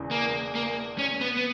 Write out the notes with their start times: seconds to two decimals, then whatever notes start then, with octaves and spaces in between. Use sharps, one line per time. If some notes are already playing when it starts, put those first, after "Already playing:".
Already playing: E1 E2 C#3 E3
0.11 A#3
0.55 A#3
0.98 C#4
1.21 B3
1.37 B3